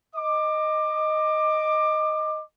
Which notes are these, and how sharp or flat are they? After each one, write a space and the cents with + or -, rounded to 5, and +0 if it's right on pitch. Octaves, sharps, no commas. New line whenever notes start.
D#5 +0 D6 +20